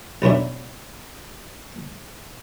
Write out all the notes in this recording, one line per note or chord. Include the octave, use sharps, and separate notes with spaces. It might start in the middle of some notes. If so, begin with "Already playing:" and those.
B1 B3 C#4 D4 E5